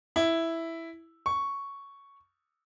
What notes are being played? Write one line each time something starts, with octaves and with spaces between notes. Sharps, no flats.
E4
C#6